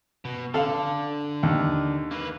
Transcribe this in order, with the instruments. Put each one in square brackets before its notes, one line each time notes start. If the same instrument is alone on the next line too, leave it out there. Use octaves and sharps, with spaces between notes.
[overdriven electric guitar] B2
[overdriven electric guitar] D3 [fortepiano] A4 F5
[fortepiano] D#2
[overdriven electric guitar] A#3 B4